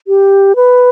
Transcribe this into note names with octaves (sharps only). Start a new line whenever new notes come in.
G4
B4